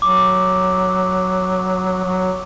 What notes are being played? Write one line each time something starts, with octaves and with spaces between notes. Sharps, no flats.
F#3 D6
F#3